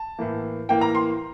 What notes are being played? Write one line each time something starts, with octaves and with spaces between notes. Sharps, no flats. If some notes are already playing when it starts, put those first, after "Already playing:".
Already playing: A5
A2 E3 A#3
A2 E3 A#3 G5
A#5
C6